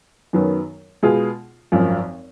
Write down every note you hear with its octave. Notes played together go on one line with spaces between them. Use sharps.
F#2 D#3 F#3 B3
B2 G#3 B3 F4 G#4
G#1 F#2 F3